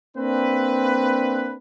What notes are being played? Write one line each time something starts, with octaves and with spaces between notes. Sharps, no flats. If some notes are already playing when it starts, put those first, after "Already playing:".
A#3 C4 D4 B4